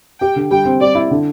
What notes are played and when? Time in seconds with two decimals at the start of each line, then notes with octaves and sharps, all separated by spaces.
0.20 G4 G5
0.36 D3
0.51 G3 G5
0.65 C4
0.81 G3 D5
0.95 E4
1.11 D3